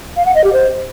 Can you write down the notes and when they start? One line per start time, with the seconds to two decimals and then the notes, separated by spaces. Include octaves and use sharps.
0.17 F5
0.26 F#5
0.35 D#5
0.44 G4
0.53 C5